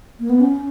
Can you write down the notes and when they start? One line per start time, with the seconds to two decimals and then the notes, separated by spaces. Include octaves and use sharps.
0.20 A#3
0.30 B3
0.40 C#4